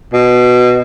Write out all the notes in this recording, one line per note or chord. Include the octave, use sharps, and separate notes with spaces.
B2